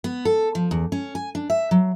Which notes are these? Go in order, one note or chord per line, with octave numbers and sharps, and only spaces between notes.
B3
A4
F3
E2
C#4
G#5
D4
E5
F#3